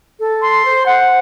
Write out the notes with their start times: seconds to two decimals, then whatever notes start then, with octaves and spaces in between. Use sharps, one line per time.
0.20 A4
0.42 C6
0.63 C5
0.86 F#5